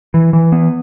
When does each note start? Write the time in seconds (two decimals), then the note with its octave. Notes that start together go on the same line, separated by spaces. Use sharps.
0.14 E3
0.33 E3
0.52 B3